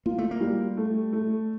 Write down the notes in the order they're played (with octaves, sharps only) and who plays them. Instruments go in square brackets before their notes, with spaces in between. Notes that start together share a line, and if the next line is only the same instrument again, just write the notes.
[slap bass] A#3 [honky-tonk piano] F4
[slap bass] A3
A#3
[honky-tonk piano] G3
A3
A3